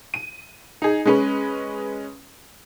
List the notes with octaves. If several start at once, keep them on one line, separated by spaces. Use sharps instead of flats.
D#7
D#4 G#4
G#3 C#4 B4